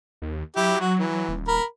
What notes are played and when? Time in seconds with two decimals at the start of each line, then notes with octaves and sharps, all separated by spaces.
0.22 D#2
0.56 F#3 E4 G4
0.80 F#4
0.99 E3
1.29 D#1
1.48 A#4 B5